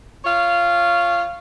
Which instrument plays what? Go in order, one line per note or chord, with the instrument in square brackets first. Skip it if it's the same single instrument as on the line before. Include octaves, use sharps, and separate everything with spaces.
[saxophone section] F4 C#5 F5